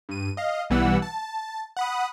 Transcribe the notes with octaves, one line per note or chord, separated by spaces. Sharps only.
G2 D#7
D#5 F5
B1 E3 G3 B3 F#5 E6
A5
F#5 B5 D#6